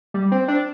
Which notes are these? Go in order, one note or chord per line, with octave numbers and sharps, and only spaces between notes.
G3
C4
D4